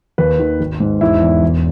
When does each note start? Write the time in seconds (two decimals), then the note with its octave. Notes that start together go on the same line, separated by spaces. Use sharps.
0.18 D#2 B4
0.39 D#3
0.60 G#1
0.80 G#2
1.01 E1 E4
1.21 E2
1.43 E1